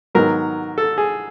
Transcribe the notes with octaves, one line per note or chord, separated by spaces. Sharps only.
G#2 D#3 F#3 B3 A#4
A4
G#4